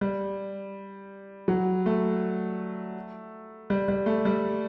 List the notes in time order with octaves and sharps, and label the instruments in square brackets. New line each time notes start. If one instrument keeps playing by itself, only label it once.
[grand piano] G3
F#3
A3
G3
G3
A3
G3